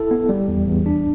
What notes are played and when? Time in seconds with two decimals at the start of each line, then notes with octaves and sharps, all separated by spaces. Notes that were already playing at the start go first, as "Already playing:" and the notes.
Already playing: E4 A4
0.11 B3
0.29 G3
0.48 E2
0.68 E2
0.86 D4